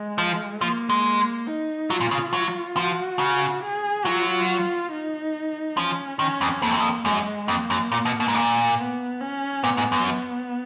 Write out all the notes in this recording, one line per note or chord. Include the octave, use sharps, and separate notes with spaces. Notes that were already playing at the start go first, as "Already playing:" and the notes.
Already playing: G#3
F3
F3 A#3
G#3
D#4
F#3 F4
A#2
C#3
F#3
F3 F#4
C#3
G#4
F#3 F4
D#4
F3 C#4
D#3 C#4
F2
F2 A#3
F#2
F2
F#2 G#3
F2 A#3
F#2
A#2
B2
B2
G#2
A#2
B3
C#4
A#2 B3
G#2
F#2
B3